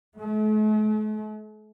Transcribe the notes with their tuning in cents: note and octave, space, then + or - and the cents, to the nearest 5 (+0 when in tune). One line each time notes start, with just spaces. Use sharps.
A3 -45